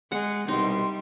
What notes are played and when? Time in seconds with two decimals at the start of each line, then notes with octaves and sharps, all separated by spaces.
0.12 G#3 F#5
0.48 C2 B2 G3 D#4 C6